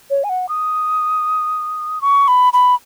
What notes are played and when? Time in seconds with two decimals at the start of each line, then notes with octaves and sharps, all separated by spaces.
0.10 C#5
0.24 G#5
0.29 F#5
0.49 D#6
2.02 C#6
2.28 B5
2.53 B5